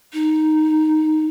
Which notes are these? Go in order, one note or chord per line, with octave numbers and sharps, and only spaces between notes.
D#4